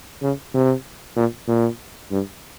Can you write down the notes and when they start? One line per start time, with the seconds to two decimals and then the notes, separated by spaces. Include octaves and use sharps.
0.22 C#3
0.54 C3
1.16 A#2
1.48 A#2
2.11 G2